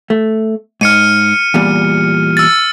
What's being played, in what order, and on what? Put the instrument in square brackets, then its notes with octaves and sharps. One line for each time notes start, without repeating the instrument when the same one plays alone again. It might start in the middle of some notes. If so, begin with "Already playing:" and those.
[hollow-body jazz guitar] A3
[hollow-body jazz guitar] G#2 [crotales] F6 C#7 D#7
[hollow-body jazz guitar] E2 A#2 G3
[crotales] E6 A6